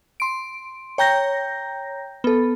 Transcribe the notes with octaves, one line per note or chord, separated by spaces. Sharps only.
C6 D7
C#5 G5 A#5 G6 A#6
B3 A4